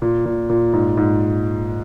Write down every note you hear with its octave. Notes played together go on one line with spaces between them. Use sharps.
A#2
A#2
A#2
G#2
G#2